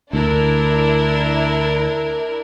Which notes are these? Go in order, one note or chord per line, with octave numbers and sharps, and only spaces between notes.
D2 D4 E4 A#4